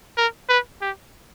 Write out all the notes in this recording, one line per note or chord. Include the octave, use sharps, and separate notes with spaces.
A#4
B4
G4